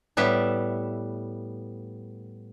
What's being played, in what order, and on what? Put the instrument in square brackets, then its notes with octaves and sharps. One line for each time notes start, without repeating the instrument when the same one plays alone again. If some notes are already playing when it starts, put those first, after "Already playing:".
[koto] A2 G3 B3 E5